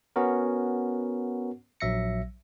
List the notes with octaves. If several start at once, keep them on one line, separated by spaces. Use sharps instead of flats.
B3 C#4 F#4 A#4
A#1 F#3 E5 A#6 C#7